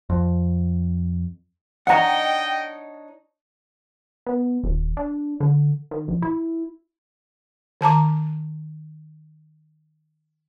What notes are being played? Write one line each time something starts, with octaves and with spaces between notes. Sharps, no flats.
F2
D4 D#4 C#5 D#5 F#5 G5 A#5
B3
D#1
D4
D3
D#3
A#1
E4
D#3 A5 A#5 D6